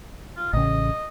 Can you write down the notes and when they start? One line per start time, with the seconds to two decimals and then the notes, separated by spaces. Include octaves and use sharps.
0.37 F4
0.53 A1 C#3 D#5